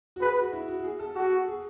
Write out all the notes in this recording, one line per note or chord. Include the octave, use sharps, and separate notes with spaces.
F#4
G#4 B4
F#4
E4
F#4
F#4
G#4
A4
F#4 A4
G#4